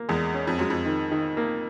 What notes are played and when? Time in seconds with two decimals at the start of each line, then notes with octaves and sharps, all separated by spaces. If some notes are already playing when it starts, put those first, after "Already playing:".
Already playing: A#3
0.09 E2 G#3
0.34 C#4
0.47 F2
0.59 F#2 G#3
0.70 F2
0.86 D#3
1.11 D#3
1.37 A#3